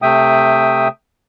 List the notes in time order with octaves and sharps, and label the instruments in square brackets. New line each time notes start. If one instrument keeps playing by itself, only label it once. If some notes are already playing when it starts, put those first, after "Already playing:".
[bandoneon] C3 A3 E5 G5 D#6